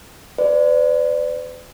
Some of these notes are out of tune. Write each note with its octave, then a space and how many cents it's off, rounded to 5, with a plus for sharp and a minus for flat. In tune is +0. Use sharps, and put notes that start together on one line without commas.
B4 +45 D5 +5